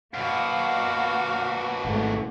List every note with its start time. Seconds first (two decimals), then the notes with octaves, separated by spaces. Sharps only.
0.14 F#2 B2 A#3 F#4 F5
1.85 G#1 A3